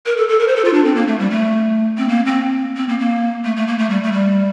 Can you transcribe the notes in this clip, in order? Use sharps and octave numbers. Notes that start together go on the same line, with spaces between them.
A#4
A4
A4
A#4
C5
A4
F4
D4
C4
A#3
A3
G3
A3
C4
A#3
C4
C4
A#3
A#3
A3
A3
A#3
A3
G3
A3
G3